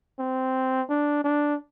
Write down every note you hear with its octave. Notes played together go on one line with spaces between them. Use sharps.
C4
D4
D4